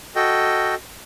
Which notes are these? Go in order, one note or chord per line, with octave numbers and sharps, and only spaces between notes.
F#4 A4 D#5 G5